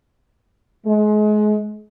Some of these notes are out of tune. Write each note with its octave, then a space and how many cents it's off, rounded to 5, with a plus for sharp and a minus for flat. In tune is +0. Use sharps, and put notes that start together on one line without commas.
G#3 +30